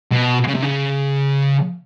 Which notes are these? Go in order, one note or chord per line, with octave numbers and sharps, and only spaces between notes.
B2
C#3
C3
C#3